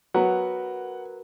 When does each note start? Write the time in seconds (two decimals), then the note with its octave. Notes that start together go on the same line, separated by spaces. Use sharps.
0.14 F#3 B3 F#4 A#4 B4 F#5